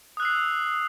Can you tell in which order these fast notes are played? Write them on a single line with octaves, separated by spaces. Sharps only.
D#6 F#6 E6 C7